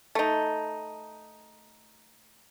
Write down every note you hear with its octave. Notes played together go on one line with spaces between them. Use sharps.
A3 D#4